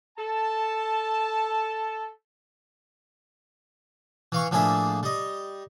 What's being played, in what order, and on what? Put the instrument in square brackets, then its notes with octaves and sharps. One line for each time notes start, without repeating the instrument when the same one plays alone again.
[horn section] A4 A5
[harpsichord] E3 F5 C#6
A2 F3 A#3 D4 G#4 E5
G3 D#5